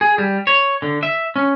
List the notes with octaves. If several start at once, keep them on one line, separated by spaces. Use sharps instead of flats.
G#4
G3
C#5
D3
E5
C#4